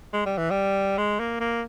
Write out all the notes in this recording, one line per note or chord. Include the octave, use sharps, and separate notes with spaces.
G#3
G3
E3
G3
G#3
A#3
A#3